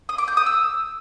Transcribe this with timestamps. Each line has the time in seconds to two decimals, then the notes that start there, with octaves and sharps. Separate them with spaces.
0.09 D#6
0.18 D6
0.28 G6
0.37 D#6
0.46 E6